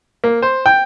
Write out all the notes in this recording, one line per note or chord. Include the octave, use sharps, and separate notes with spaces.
A#3
C5
G5